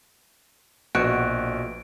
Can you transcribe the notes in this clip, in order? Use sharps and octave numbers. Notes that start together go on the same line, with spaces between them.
A#1 B2 F#4 D7